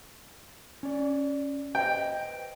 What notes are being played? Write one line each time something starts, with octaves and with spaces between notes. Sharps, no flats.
C#4 D5
B4 C5 D#5 G5